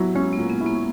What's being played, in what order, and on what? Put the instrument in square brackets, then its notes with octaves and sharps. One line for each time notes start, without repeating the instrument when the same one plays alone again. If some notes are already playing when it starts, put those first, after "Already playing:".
Already playing: [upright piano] F#3 E4 [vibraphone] B3
[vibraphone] G#3 [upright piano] C#4
[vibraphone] A#3
[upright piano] A#2
[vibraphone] B3
[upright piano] E4
[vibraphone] A#3